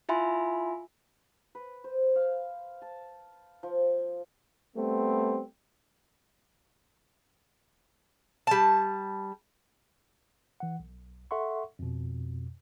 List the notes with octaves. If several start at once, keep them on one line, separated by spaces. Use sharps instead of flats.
E4 F4 E5 G#5 B5 C6
B4
C5
F5
A5
F3
G3 A3 B3 C4
G3 A5
E3 F#5
B1
A4 E5 F#5 C6 C#6
F2 B2